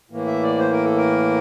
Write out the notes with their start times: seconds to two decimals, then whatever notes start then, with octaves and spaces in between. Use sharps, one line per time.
0.10 A2 E3 A#3
0.26 E5
0.43 D5
0.59 C5
0.72 A#4
0.84 A4
0.97 A#4